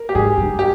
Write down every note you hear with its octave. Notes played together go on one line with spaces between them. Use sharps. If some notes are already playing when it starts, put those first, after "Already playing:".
Already playing: A#4
G4
G#2 G#4
G2
G4